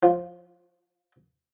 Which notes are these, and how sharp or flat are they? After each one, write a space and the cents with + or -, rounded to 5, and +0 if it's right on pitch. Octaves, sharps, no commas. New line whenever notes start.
F3 +10 F4 +0